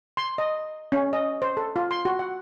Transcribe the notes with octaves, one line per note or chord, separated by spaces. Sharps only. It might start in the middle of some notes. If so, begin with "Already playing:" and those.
C6
D#5
C#4
D#5
C5
A4
F4
C6
F#4
F#5